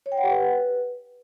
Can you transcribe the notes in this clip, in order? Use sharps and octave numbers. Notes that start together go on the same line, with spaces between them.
C#5
G5
F#5
G4
B4